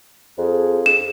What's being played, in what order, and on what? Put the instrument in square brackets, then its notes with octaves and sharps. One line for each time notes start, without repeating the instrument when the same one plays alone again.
[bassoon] F2 [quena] G#4
[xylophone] E7